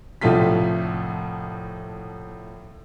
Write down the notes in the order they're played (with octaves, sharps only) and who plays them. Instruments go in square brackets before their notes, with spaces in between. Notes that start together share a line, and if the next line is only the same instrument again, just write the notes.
[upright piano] C2 A2 F3 A3 F4 B6